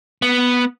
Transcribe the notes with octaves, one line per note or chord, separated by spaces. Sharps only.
B3